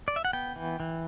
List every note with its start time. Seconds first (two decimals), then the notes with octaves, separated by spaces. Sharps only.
0.08 D5
0.16 E5
0.25 F#5
0.33 B3 G5
0.56 E3
0.80 E3